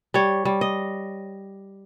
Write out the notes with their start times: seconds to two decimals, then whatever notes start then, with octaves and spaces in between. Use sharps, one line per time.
0.14 G3 C#5
0.45 G3
0.61 D#5